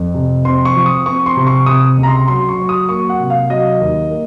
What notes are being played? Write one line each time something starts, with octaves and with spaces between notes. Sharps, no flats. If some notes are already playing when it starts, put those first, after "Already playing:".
Already playing: F2
C3
C4 C6
C#6
F3
D#6
C4 C#6
C6
C3
C#6
C3 D#6
C#2
A#5
C6
F#3 C6
C#6
F#3
D#6
A#3 C#6
F#5
C3
F5
F#3 D#5
D#2
A#3